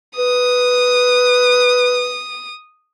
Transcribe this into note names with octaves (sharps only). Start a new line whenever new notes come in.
B4 D#6